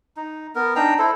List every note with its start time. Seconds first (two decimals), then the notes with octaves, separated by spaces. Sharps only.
0.17 D#4
0.55 B3 A#4
0.76 D4 D#4 G5 A#5
0.99 E4 A4 C5